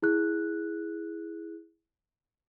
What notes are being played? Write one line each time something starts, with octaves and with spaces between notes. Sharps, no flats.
E4 G#4 F#6